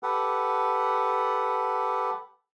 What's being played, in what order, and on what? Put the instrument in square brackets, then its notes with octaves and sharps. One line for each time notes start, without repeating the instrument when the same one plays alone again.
[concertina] G4 A4 B4 F#5